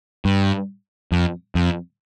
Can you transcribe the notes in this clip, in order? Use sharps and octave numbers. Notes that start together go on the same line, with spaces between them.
G2
F2
F2